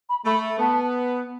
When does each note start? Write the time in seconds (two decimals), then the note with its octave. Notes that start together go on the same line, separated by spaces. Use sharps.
0.09 B5
0.25 A3 B5
0.59 B3 A5